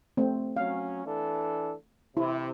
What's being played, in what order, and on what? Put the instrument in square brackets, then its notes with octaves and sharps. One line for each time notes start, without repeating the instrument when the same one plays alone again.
[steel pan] A3 C4
[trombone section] F#3 C#4 [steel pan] F5
[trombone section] E3 D4 A4
[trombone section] C3 [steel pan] E4